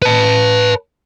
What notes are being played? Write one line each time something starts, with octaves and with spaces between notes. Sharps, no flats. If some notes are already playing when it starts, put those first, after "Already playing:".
B4 A5